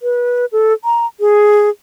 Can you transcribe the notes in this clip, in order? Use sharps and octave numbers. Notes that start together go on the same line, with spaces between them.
B4
A4
A#5
G#4